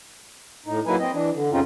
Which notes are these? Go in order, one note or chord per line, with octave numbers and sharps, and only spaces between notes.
A2 D#4
F#3 A#3 D#4 E4 B4 G#5
C4 D#5
E3 D4
D3
F#2 C#3 C4 C#4 D#4 F4